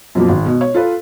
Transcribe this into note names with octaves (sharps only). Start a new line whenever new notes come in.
F#2 B2 F3 A#3
G#1
B2
C#5
F4 A4 B4